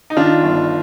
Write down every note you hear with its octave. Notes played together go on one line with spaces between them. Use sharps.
D#4
D#3 D4 F4
G1